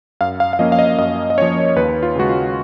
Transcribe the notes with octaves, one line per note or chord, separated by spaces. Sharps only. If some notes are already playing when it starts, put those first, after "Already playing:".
F#2 F5
F5
F5
F3 A#3 C#4 D#5
F5
D#5
F#2 D#5
D#5
F3 A#3 C#4 C#5
D#2 B4
F4
C#3 G#3 F#4
F4